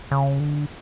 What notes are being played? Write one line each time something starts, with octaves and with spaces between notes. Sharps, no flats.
C#3
D3